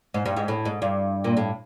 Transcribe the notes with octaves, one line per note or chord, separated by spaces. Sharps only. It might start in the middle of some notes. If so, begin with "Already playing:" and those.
G#2
G2
G#2
A2
G#2
G2
A#2
A2